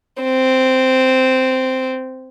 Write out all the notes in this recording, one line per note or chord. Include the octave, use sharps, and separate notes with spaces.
C4